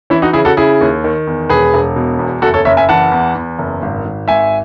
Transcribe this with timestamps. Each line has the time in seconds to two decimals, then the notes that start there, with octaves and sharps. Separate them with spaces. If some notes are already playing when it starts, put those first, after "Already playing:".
0.10 E3 C#4 E4
0.22 D#4 F#4
0.33 C#3 E4 G#4
0.45 F#4 A4
0.57 C#3 E4 G#4
0.81 D#2
1.04 D#3
1.27 E2
1.49 E1 G#4 B4
1.74 E1
1.96 B2
2.19 E2
2.42 F#1 F#4 A4
2.54 A4 C#5
2.65 F#1 C#5 E5
2.77 E5 G#5
2.89 E3 F#5 A5
3.12 E2
3.35 E2
3.59 F#1
3.82 G#1
4.05 G#1
4.28 G#1 E5 G#5